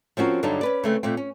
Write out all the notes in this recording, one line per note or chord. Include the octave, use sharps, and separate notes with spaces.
F3 C4 C#4 F#4 A#4
G2 D3 F#3 G3 D4 D#4
C#4 B4 D5
C#3 A3 C4
A#2 A3 C4
C#4